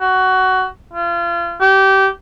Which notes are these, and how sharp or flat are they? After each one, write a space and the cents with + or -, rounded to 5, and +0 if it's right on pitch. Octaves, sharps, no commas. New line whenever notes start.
F#4 +15
F4 -30
G4 -20